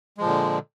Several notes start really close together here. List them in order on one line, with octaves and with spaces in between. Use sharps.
G#3 F3 A#2 D3